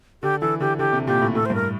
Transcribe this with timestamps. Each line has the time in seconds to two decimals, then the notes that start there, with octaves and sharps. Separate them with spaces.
0.22 D3 G4
0.41 E3 A4
0.60 D3 G4
0.79 D3 G4
0.93 C3
1.07 A#2 G4
1.22 A2
1.35 A2 A4
1.46 C5
1.50 G2
1.55 A#4